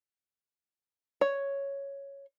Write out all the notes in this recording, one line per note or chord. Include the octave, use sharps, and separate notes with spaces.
C#5